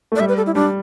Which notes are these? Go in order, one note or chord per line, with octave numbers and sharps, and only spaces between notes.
A3
D5
G3 E5
B4
A4
E4
G3 D4